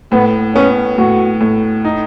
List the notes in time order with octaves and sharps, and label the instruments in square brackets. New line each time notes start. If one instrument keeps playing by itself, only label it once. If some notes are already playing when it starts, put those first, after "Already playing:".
[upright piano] A2 [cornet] B3
[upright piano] B3 [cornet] C#4
[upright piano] A2 [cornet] F#4
[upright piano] A2
D#4